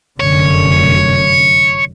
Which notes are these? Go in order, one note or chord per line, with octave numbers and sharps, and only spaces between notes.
F1 F#2 D3 C#5